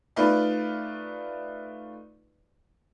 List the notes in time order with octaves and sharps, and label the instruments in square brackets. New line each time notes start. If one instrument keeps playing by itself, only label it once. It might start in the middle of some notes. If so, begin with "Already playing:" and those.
[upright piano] A3 D#4 F4 B4 D5